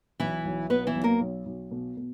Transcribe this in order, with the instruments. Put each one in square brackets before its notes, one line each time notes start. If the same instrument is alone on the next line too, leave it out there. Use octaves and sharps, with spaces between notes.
[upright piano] B1 [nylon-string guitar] E3 E4
[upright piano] B1
[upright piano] B2 [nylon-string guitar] B3 B4
[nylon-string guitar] E3 E4
[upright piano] B1
[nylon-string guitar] A#3 A#4
[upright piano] B1
B1
B2
B2